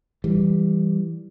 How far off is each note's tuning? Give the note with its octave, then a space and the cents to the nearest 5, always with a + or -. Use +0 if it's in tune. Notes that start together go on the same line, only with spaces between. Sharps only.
E3 +0 G3 +0